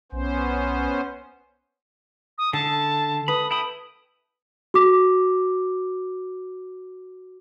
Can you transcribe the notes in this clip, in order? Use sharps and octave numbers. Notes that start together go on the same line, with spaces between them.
B1 B3 C#4 C5
D#6
D3 A4 A5
B4 B5 D#6
E4 G5 B5 D#6
F#4 D6